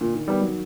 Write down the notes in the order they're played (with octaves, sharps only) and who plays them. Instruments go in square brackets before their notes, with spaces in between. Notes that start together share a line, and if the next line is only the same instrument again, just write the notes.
[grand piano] A#2 [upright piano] D3
[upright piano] D#3
[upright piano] D#3 [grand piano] G3 B3
[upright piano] F#3